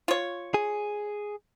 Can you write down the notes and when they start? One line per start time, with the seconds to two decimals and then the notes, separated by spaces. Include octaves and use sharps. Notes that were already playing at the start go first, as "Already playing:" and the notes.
0.08 F4 C#5
0.54 G#4